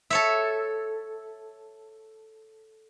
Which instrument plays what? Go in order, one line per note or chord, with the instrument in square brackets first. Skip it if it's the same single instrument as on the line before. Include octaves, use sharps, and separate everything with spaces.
[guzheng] A4 C#5 E5